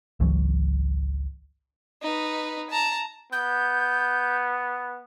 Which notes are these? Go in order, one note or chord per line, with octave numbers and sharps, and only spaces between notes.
G#1 C#2 E3 F#3
D#4 B4
A5 A#5
B3 G6